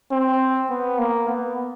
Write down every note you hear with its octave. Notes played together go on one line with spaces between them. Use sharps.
C4
B3
A#3
B3